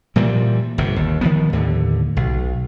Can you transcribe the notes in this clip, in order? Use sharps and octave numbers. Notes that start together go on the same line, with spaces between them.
A#2 E3 F3 G3
G1 C3
D#2
D#3 F3 B3
D#2 A2 D3
B1